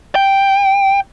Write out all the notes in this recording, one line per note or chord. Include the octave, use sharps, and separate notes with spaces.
G5